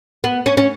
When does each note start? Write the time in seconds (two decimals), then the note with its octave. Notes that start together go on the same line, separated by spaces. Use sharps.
0.24 B3
0.46 C#4
0.57 C#4